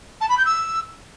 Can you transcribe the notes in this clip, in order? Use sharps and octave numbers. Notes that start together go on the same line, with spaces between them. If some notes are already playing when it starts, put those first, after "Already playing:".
A5
B5
G6
E6